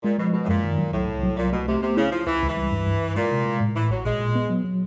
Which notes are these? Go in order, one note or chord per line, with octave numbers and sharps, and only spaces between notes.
A#2 G#3
B2 F3
B2 G#3
A2
F#2 A#2
D#3
F#3
C2 A2
C2
F#3
C2 A#2
B2 A3
C3 A3
C3 B3
C#3 E4
F3 E4
C#2 E3
C#2
E3
G3
G2
G2
G2
A#2 G#3
C3
G#3
A2
A2 E3
A1 F#3
A#2 G#3
A#2
B3
F#3
F#3